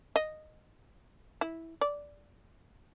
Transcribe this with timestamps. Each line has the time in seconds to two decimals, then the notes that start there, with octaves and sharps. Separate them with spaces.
0.16 D#5
1.41 E4
1.81 D5